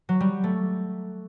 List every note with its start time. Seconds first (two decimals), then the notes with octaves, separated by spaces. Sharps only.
0.09 F#3
0.20 G3
0.44 A3